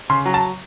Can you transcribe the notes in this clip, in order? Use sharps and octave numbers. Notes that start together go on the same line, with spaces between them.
C#3 C6
F#3
A5